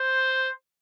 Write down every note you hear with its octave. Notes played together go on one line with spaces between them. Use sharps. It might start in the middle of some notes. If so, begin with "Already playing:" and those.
Already playing: C5